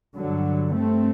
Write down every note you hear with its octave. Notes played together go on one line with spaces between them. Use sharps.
G2 D3 F#3
G2 A3 C4